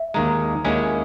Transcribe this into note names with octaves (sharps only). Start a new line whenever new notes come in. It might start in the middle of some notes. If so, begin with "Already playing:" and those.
Already playing: E5
D#2 D#3 G#3 A#5
D#2 D#3 G#3 C#4 E4 G#5